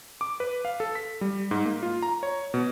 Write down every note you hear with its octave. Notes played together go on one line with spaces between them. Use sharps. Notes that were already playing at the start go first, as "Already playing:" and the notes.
D6
B4
F5
A4
B6
G3
G#2
A#3
F4
A#5
C#5
B2